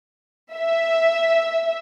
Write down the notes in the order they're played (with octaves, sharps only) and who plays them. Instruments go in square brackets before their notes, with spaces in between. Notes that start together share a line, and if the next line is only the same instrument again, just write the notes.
[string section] E5